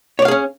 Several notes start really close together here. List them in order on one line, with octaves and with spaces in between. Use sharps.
C#5 D5 F5 G#4 C#4